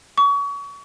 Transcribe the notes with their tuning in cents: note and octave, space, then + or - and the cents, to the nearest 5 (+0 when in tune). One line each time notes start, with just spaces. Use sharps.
C#6 +30